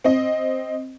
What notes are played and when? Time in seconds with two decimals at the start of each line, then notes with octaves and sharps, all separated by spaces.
0.04 C4 D#5